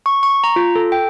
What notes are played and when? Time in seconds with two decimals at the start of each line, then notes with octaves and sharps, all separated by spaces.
0.06 C#6
0.23 C#6
0.44 A#5
0.56 F4
0.76 A4
0.92 G5